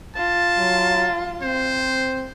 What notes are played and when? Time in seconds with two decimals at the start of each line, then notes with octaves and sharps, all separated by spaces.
0.16 F4 A5
0.58 F#3
1.42 C4 C5